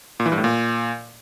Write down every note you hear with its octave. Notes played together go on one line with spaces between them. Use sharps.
A#2
E3
G2
A2
A#2